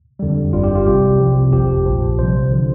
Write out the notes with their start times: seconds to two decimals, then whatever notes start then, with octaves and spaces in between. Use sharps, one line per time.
0.19 F2 D3 G3
0.53 G1 G2 G3 F4
0.64 G4
0.75 F4
0.86 C2 C3 G3 G4
1.20 C2 C3 F3
1.52 G1 F2 F3 G4
1.86 A#1 A#2 F3
2.18 C2 C3 G3 C5
2.52 D3 F3